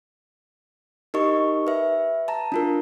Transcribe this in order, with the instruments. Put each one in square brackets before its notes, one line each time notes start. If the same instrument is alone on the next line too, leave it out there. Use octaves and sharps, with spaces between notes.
[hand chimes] D#4 G4 A#4 D#5 C#6
B4 E5
A5 A#5
D4 F4 A#4